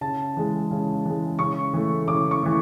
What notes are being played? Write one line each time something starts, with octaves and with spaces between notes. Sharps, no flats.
C#3 A5
E3 G#3
C#3
E3 G#3
C#3 C#6
E3 A3
C#3 D6
C#6
E3 A3